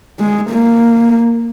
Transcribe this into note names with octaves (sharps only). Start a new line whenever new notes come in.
G#3
A#3